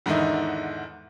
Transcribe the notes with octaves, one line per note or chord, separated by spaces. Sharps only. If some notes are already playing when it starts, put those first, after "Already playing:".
E2 G#2 D3 D#3 D#4 E4